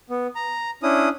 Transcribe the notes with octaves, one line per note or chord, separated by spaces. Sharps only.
B3
A#5
C#4 D4 E4 D#6